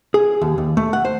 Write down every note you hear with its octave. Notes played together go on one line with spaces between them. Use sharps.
G#4
D#2
D#2
A3
F#5
C5